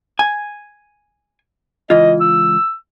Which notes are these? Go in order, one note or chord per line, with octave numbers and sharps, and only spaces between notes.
G#5
C#2 E3 F4 D#5
E6